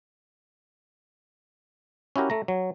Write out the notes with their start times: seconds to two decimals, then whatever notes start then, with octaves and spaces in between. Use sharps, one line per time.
2.16 C#4 E4 F#4 G4 A#4
2.30 A3 A#5
2.48 F#3